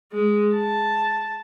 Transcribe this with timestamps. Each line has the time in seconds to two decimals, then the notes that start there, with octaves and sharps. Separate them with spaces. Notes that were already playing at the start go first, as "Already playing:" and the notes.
0.12 G#3
0.55 A5